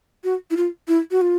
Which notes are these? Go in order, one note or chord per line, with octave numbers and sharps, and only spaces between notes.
F#4
E4
F4
E4
F#4
F4